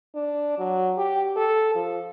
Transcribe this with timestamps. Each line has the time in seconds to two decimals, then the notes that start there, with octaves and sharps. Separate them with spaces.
0.15 D4
0.58 F#3
0.97 G4
1.36 A4
1.75 F3